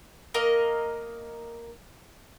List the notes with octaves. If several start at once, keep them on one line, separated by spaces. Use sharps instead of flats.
A#3 A#4 D#5